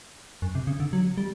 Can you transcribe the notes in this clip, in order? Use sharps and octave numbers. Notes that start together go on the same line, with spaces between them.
F#2
C3
C#3
D3
F#3
G3